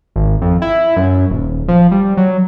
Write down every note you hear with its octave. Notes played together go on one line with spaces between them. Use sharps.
G#1
F2
E4
F#2
D#1
F3
G3
F#3